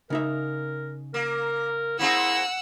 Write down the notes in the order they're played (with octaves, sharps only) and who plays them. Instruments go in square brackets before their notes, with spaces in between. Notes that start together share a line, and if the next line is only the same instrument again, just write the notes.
[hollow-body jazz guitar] C#3 D#4 E5 [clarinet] A#4
[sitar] A#3 [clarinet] A#4
[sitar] A#3 C4 G#4 [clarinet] E4 [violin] F#5 E6